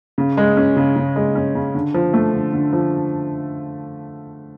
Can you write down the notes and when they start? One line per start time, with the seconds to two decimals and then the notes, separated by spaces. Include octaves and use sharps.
0.18 C#3
0.37 G#3
0.57 C#4
0.77 C#3
0.96 C#3
1.16 G#3
1.35 C#4
1.55 C#3
1.75 D3
1.94 F3
2.14 A3
2.33 D3
2.53 D3
2.73 F3